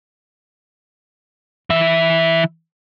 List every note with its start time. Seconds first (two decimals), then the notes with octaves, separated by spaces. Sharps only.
1.70 E3 E5